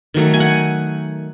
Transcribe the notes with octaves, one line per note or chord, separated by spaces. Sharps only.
D#3 F#3 A3
G#5
F#5